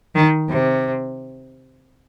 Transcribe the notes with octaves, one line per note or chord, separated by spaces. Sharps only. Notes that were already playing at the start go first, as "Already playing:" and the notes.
D#3
C3